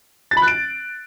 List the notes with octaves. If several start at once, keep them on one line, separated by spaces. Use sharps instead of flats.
A6
B5
F#6
D7